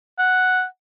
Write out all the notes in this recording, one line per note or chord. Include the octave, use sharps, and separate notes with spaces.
F#5